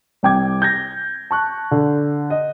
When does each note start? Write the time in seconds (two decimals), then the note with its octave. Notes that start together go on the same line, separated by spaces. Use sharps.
0.23 C2 C4 G5 D6 G#6
0.62 G6 G#6 A#6
1.31 A5 C#6 F#6
1.71 D3
2.30 D#5